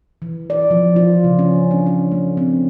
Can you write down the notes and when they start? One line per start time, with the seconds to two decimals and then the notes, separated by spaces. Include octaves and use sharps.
0.22 E3
0.50 D5
0.71 F3
0.96 F4
1.24 C#3
1.39 C#4
1.71 D4
1.86 C#4
2.12 A3
2.37 C4